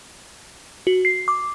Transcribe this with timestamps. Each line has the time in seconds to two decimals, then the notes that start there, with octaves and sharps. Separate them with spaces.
0.87 F#4
1.05 C7
1.28 D6